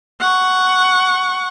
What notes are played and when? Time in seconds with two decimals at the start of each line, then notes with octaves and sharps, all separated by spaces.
0.20 F#5 C#6